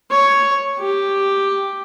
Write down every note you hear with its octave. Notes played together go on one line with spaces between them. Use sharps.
C#5
G4